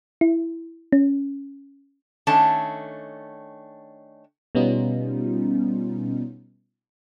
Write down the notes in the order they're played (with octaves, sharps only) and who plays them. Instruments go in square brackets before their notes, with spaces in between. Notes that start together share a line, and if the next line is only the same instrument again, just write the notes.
[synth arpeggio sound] E4
C#4
[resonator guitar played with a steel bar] D#3 A3 C#4 D4 A5
[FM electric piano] B2 G3 B3 C#4 D#4 F4